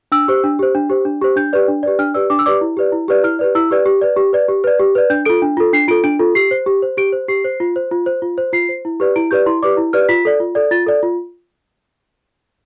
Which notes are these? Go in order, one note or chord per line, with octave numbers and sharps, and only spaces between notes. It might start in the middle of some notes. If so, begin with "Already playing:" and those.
D4 E6
G4 C5
D4
G4 C5
D4
G4 C5
D4
G4 C5
D4 G6
G4 B4 D5
D4
G4 B4 D5
D4 F6
G4 B4 D5 E6
D4 D6
E6
G4 B4 D5 D6
E4
G4 B4 D5
E4
G4 B4 D5
E4 F6
G4 B4 D5
E4 E6
G4 B4 D5
G4
B4 D5
G4
B4 D5
G4
B4 D5
G4
B4 D5
D4 G6
F4 A4 D7
D4
F4 A4
D4 C7
F4 A4 D7
D4 D7
F4 A4
G4 C7
C5
G4
C5
G4 D7
C5
G4 C7
C5
F4
C5
F4
C5
F4
C5
F4 C7
C5
E4
G4 B4 D5
E4 D7
G4 B4 D5 G6
E4 C6
G4 B4 D5 D6
E4
G4 B4 D5 F6
F4 B6
A4 D5
F4
A4 D5
F4 A6
A4 D5
F4